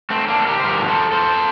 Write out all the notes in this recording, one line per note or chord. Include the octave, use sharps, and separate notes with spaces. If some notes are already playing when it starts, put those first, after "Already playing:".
A3 C4
A#3 D4
A4
G4 A#4
C5
G2 D3 F3 G4 A#4
A4 C5
A4 C5